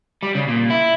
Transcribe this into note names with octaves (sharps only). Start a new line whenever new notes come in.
G3
C#3
A#2
E4